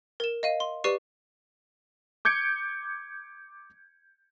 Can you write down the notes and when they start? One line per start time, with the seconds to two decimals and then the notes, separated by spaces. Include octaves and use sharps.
0.20 A#4 E7
0.43 D#5 F5 D#7
0.60 C6
0.84 G4 B4 D5 C#6 C7 D#7
2.25 D6 G6 G#6 C#7 D7